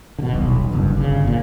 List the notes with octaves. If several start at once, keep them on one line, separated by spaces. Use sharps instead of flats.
B2 D3
D#1 B1
F#1 G2
G1 C#3
A#2